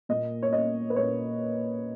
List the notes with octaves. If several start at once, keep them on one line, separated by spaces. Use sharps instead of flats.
A#2 A#3 D#5
C#5
D#5
B4
A#2 A#3 C#5